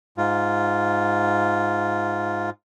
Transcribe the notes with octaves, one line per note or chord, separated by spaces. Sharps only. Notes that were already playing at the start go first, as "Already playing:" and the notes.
G#2 F4